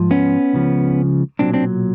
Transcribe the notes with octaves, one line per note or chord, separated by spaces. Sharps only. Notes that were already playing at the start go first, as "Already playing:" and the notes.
Already playing: G#2 F3
B3 C#4
C#2 C#3 F3
B1 A#2 F#3 C4 D4
C4 D4